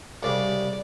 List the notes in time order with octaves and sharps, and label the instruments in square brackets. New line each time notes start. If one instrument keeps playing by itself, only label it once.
[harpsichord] C2 C#3 G3 [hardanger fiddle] D5